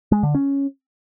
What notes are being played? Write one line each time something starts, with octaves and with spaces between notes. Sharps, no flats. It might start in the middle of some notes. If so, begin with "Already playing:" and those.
G#3
D3
C#4